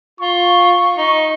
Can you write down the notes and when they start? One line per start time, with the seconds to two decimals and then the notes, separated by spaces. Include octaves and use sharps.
0.20 F4 C#6
0.98 D#4